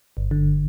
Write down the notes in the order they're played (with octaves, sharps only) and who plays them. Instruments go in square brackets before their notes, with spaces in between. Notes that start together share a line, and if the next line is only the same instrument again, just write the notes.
[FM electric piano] G1
D3